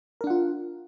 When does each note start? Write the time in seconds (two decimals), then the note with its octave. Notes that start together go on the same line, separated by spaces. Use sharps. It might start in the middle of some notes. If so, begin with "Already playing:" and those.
0.21 A#4
0.24 D4
0.27 F#5
0.30 F4